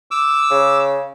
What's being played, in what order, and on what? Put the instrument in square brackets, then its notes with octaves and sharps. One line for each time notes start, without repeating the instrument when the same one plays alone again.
[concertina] D6 E6
[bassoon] C#3